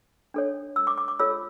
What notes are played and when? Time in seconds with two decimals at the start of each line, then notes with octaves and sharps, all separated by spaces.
0.34 D4 A4 C#5
0.76 E6
0.87 D6
0.98 D6
1.08 D6
1.19 F4 A4 C#5 E6